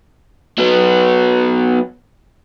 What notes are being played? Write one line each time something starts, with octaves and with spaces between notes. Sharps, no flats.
F#3 B3